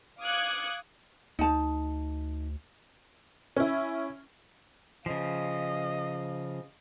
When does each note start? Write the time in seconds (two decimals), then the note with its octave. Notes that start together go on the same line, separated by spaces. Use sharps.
0.21 F5 D6 D#6 F#6 G#6 C#7
1.39 D2 D#4 A5
3.56 C#4 E4
5.06 C#3 F3 D#5 F5